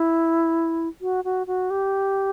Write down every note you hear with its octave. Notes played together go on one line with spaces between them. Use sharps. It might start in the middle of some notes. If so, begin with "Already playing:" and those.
Already playing: E4
F#4
F#4
F#4
G4